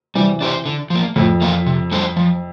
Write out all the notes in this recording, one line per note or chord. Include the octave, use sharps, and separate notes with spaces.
C3 E3 G3
D4 G4 C5
D3
F3
A#3
F2 A2
E3 A#3 F4
C3
G3 D4 A4 C5
F3